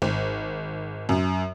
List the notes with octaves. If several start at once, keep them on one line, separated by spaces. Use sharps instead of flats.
G#1
F#2